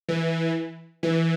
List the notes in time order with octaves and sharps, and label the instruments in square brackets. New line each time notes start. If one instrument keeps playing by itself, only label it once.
[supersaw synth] E3
E3